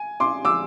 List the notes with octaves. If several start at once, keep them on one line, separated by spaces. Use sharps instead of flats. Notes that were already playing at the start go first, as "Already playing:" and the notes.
Already playing: G#5
C6 D6
D6 E6